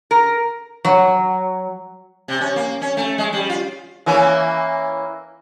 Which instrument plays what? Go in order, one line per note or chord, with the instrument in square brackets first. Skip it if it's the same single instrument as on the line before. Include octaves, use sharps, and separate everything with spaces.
[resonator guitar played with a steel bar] A#4
[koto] F#3
[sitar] C3
C#4
A#3
C#4
A3
G#3
G3
F4
E3 A#3 C#4